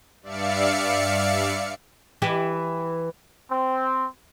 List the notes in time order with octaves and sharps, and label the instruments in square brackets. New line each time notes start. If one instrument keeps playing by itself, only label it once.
[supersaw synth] G2 D5 E5 F5 C#7
[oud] E3 E4 G4
[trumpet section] C4